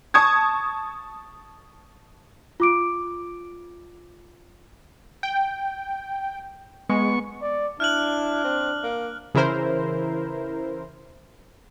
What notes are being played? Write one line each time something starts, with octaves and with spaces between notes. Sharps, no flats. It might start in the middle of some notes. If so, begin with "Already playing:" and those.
A5 C#6 D#6 G#6
F4 D6 D7
G5
G#3 B3 C#6
D5
D4 E4 F6 F#6 F#7
C4
A#3
C#3 E3 E4 A#4 C5